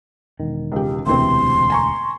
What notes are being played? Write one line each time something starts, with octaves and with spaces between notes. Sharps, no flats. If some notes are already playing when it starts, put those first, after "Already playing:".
E1 D#3
C#2 G4
E1 D2 C3 E3 C4 C6
G#5 A#5 C#6